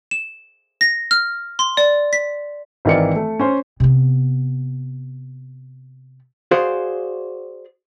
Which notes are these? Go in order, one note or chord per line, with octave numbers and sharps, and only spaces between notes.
E7
A#6
F6
C6
D5
B6
G#1 D#3 E3 A#4 D5 C#7
A3
C#4 C5
C3 B3
F#4 G#4 C5 D5 F5